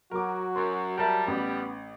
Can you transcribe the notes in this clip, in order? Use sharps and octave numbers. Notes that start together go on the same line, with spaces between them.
F#3 F#4 A#4 D6
F#2 C6
G3 A#4 E5 A5
A1 B3